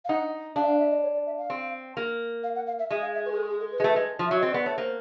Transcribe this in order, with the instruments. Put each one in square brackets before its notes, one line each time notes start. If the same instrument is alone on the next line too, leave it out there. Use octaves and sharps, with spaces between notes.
[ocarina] F5
[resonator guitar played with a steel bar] D#4 [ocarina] F#5
[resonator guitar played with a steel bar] D4 [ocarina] F5
[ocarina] E5
F5
E5
D#5
C#5
D5
E5
F5
[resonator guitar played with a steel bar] C4
A#3
[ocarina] F5
F#5
F5
E5
[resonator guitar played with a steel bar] G#3 [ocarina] E5
[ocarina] F5
E5
B4
G#4
A4
G#4
A4
B4
[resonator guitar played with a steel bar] G#3
A3
G#3
F3
[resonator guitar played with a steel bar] F#3 [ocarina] E5
[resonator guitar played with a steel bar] C4 [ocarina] D#5
[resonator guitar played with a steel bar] B3 [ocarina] D5
[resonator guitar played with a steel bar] A3 [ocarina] C#5
[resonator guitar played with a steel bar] A#3 [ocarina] C5